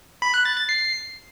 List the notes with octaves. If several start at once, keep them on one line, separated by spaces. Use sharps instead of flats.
B5
F#6
A6
A6
C7